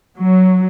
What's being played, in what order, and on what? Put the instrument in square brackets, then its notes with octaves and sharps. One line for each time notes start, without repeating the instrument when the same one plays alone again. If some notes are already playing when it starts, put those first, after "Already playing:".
[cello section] F#3